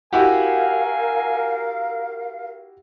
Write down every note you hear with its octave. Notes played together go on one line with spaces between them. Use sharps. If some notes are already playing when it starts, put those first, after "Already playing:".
E4 F#4 G4 A#4 F5 G#5